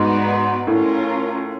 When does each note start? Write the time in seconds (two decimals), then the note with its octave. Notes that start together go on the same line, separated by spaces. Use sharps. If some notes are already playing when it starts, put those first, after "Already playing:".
Already playing: G#2 B3 D#4 F#4 B4 D5
0.67 A2 C#4 F4 A#4